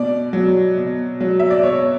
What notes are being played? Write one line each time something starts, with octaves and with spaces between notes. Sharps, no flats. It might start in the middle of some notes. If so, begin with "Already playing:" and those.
Already playing: B2 D5
F#3
B2
F#3
E5
D5
B2 C#5